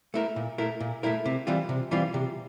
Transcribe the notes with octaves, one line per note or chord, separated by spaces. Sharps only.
A3 E4 A#4
A#2
A3 E4 A#4
A#2
A3 E4 A#4
C3
E3 G3 C4 F4
C3
E3 G3 C4 F4
C3